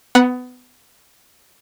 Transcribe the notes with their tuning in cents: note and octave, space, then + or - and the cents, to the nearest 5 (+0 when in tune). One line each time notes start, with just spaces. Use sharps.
B3 +20 F#5 +0 B5 -25